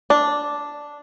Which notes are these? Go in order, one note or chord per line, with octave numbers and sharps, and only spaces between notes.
D4